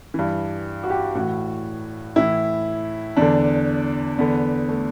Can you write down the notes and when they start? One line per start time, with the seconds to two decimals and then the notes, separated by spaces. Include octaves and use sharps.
0.14 G2 E3
0.84 F#4
0.90 G4
1.15 A2 E3 F#4
2.16 A2 E3 E4
3.17 E2 D3 D4
4.18 E2 D3 B3
4.69 A3